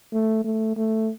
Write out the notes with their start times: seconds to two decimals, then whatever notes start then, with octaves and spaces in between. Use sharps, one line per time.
0.13 A3
0.44 A3
0.77 A3